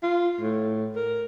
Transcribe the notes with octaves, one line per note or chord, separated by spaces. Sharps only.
F4
A2
A#4